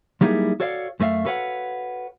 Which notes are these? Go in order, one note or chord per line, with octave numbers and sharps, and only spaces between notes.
F#3 G3 A#3 D#4 E4 G#4
F#4 A4 C#5 D5 F5
F#2 A3 D#4 A#4 E5 F5
F#4 A4 B4 C#5 F5 F#5